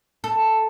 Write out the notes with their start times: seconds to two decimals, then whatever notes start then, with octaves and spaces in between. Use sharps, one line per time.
0.24 A4